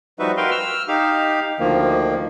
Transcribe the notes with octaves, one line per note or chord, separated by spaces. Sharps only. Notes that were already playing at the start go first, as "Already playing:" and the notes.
F3 G3 D#4 F#4 B4 E5
F#4 A#4 B4 F5 G5 C6
E6 F6
D#4 G4 F5
D2 D#3 F3 A#3